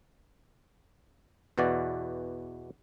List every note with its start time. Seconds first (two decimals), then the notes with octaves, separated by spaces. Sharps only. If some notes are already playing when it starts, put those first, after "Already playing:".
1.58 E2 B2 E3 F#4 D5